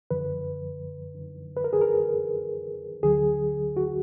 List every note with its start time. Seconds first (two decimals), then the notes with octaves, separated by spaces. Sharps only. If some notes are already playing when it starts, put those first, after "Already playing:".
0.11 F#2 D3 F3 B4
1.57 B4
1.64 A#4
1.73 G#4
1.81 A#4
3.03 D2 D3 F#3 G#4
3.77 F#4